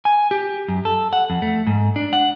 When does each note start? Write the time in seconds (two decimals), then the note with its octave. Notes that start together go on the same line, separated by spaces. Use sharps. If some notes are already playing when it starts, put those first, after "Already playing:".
0.05 G#5
0.31 G4
0.68 F#2
0.85 A4
1.13 F#5
1.30 F2
1.42 A3
1.67 G#2
1.96 D4
2.13 F#5